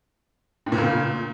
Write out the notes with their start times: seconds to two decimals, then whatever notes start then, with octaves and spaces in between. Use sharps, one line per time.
0.66 A2
0.72 A#2
0.78 C#3
0.83 A#2